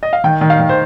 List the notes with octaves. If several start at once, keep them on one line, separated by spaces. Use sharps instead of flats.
D#5
F5
D#3 G5
D#3
F5
D#3
C5